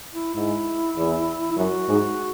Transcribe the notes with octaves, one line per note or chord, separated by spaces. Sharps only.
E4
G#2 E4
E2
E4
F#2 F#4
G#2